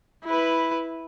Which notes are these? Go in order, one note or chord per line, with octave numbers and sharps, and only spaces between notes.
E4 B4